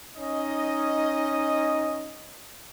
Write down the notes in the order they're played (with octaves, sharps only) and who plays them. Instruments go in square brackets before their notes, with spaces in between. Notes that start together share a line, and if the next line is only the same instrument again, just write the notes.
[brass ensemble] C#4 D#4 D#5